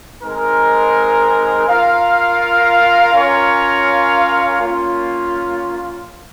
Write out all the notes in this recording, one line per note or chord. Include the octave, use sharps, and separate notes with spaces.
G#3 C4 D#4 A#4
F4 A#4 F5
C#4 F4 A#4 C#5 F5
A#3 C#4 F4